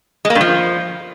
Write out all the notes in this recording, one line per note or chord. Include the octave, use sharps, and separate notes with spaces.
G#3
A#3
G2
F3